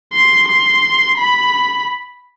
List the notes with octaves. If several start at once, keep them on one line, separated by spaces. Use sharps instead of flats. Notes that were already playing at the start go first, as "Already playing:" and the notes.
C6
C6
B5